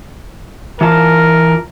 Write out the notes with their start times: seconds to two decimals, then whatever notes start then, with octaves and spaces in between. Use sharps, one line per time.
0.81 E3 F4 A#4 A5